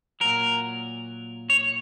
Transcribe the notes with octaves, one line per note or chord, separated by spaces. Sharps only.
A#2 F#3 A#4
C#5